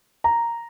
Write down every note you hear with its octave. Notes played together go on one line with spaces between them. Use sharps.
A#5